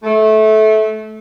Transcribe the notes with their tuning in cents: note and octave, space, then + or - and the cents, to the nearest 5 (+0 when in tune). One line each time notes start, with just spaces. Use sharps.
A3 -20